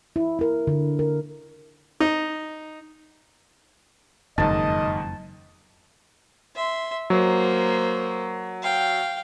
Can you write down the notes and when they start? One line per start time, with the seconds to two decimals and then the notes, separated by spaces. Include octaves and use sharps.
0.16 E4
0.39 E4 A#4
0.67 D3
0.99 A#4
2.00 D#4
4.38 F#1 F2 G#2 D#3 D#5 A5
6.55 E5 C6
7.10 F#3 A#3 C5
8.63 F5 G5